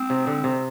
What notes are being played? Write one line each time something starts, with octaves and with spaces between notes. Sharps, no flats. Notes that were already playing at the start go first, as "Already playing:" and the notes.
Already playing: C4
C3
D3
C3